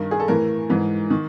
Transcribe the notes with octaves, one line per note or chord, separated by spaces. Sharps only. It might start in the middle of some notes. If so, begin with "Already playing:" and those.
Already playing: G2 D#3 A#4
G#4
A4
A2 E3 A#4
G#2 E3
D#3